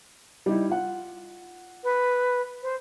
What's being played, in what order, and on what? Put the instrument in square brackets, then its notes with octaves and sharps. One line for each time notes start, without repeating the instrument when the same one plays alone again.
[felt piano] G3 D#4 E4
F4 F#5
[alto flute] B4
C5